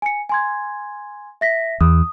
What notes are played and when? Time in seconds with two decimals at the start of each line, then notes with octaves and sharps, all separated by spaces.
0.02 G#5 C#7
0.29 G#5 C6 G#6
1.41 E5 A#6 B6
1.81 E2 D#6